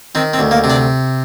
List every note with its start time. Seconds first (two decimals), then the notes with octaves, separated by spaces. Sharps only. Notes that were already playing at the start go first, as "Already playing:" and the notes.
0.15 D#3 C4
0.34 C4
0.39 D2
0.51 A#3
0.64 C3
0.70 D4